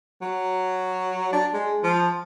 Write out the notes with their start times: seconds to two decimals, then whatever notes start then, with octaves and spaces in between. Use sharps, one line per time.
0.22 F#3
1.33 D4
1.53 G#3
1.84 F3